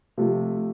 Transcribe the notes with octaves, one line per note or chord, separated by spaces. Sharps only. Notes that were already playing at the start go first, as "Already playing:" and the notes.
C3 F3 A3